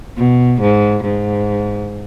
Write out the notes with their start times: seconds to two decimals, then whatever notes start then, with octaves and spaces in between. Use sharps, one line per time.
0.18 B2
0.61 G#2
1.04 G#2